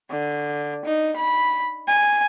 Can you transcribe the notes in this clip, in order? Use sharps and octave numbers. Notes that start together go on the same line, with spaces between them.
D3
D#4
B5
G#5